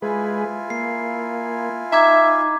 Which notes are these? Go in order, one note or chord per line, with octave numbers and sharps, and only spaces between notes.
G#3 E4 F4 G#4 B4 G#5
A#3 C7
D#4 E5 A#5 D6 G#6